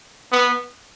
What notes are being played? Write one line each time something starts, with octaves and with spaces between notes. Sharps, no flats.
B3